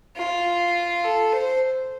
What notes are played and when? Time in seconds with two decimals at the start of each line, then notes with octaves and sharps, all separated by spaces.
0.16 F4
1.04 A4
1.33 C5